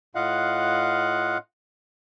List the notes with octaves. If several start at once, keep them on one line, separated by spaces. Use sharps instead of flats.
A2 F4 D#5 F5 F#5 F#6